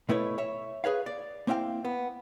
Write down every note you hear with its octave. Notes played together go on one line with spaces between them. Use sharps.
B2 A3 E4 B4 C#5
C#5 E5
G#4 B4 C#5 F5
D5
A#3 C4 E4 F5 G5
B3